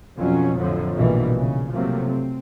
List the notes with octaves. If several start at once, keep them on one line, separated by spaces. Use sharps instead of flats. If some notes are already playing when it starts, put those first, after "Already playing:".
F2 B2 F#3 C#4
F2 A2 D3 F3 F#3
A#1 G2 B2 E3 G3
C#3
C3 F3 F#3 A3 A#3
C4